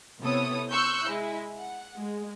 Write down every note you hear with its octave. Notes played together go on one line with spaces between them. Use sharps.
C3 B3 E4 A4 C#5 D#6
C6 C#6 E6 F#6 G6 C#7
G#3 E4
F#5
G#3